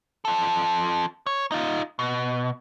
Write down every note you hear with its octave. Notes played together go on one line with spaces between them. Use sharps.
F3 A4
C#5
D#4 F4
B2